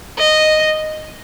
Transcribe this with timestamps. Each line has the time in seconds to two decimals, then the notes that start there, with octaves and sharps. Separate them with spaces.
0.18 D#5